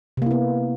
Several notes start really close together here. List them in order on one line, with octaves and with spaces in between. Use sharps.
C3 A#3 E4 B3